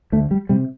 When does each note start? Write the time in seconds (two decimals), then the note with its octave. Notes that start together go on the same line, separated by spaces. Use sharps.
0.12 D2 A3
0.31 G3
0.49 C3 G3